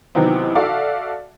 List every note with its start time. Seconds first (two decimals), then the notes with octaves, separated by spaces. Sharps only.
0.15 C3 D#3 E3 F#3 B3 C4
0.55 F#4 A4 D5 E5 F5 D6